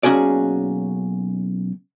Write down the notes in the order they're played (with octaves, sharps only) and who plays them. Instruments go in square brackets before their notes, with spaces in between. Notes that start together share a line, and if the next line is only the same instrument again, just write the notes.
[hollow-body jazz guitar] B1 A#3 C#4 F#4 G#4 D5